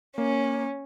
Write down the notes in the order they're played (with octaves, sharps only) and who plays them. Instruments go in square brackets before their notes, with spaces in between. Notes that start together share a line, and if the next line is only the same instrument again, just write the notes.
[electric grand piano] A#3 [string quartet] C#4